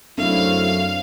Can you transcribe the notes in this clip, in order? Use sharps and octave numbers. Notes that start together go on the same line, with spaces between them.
F#2 A3 C4 D4 E4 F5